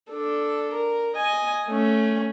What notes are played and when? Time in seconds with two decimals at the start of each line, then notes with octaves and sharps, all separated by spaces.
0.11 D4 A4
0.74 A#4
1.16 D#5 G#5
1.67 A3 C#4